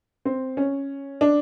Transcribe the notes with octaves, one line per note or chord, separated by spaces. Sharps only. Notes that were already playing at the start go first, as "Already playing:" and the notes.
C4
C#4
D4